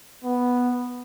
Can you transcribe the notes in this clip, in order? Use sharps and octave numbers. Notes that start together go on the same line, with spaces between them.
B3